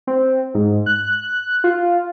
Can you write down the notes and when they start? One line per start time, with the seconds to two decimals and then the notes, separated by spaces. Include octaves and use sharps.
0.07 C4
0.54 G#2
0.86 F#6
1.64 F4